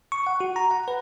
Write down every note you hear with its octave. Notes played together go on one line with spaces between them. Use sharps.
C#6
F#5
F#4
A#5
F#5
B4